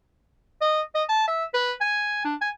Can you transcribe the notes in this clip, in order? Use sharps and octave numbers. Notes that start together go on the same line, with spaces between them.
D#5
D#5
A5
E5
B4
G#5
D4
G#5